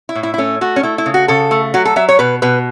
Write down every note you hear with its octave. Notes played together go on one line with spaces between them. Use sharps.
E4
A2
E4
E4
A3 C#4
A3 F#4
C#4
A3 E4
E4
C#3
F#4
C#3 A4
A3
F#3 F#4
A4
F#3 E5
C#5
B2 B4
B2 B4